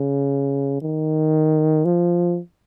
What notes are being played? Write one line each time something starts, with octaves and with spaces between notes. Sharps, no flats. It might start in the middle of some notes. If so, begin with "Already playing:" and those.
Already playing: C#3
D#3
F3